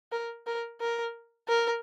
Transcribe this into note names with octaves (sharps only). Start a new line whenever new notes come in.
A#4
A#4
A#4
A#4